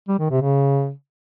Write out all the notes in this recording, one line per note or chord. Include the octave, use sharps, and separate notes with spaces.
G3
D#3
C3
C#3